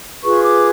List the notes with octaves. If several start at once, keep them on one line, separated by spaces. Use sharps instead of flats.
F4 G#4 B4 C#6
D6